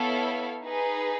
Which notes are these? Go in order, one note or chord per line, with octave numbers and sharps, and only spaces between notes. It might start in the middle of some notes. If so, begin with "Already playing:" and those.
Already playing: B3 E4 A4 C#5 F5
D#4 G#4 B4